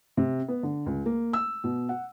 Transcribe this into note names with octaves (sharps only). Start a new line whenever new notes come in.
C3
B3
D3
C#2
A#3
E6
B2
F#5